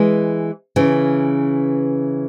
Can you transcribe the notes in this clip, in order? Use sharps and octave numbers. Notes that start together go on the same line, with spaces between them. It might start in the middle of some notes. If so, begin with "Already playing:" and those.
Already playing: E3 G#3
C#3 E3